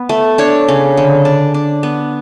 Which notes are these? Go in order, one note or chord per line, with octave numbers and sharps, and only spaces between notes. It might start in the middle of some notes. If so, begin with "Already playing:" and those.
Already playing: B3
A3
D4 C#5
C#3
D3
D4
D4
B3